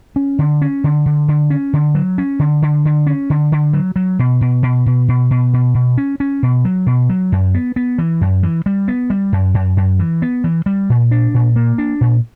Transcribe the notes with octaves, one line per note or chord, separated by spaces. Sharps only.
C#4
D3
C#4
D3
D3
D3
C#4
D3
F#3
C#4
D3
D3
D3
C#4
D3
D3
F#3
F#3
B2
B2
B2
B2
B2
B2
B2
B2
C#4
C#4
B2
F#3
B2
F#3
F#2
B3
B3
E3
F#2
E3
G3
B3
G3
F#2
F#2
F#2
E3
B3
E3
G3
A#2
D4
A#2
A#3
D4
A#2